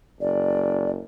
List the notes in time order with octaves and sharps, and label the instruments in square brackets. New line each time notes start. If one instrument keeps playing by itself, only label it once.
[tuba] F#1 [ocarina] D5